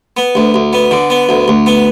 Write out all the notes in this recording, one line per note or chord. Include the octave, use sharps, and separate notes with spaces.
B3
D2
D2
B3
D3
B3
D2
D2
B3